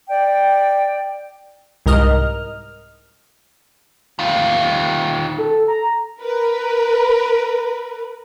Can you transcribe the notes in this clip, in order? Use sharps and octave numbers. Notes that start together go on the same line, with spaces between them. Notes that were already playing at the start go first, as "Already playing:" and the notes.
D5 G5
C2 G#2 A#4 D#5 F6
D#3 F4
A4
A#5
A#4 B4